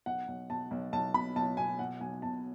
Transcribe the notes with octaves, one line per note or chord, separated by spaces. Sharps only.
B1 F#5
B1
B2 A5
B1
B1 A5
B2 B5
B1 A5
B2 G#5
B2 F#5
B1 G#5
B2 A5